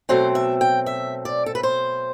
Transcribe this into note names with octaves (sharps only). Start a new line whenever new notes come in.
B2 F#3 A3 C4 C5
E5
G5
E5
D5
A4
B4
C5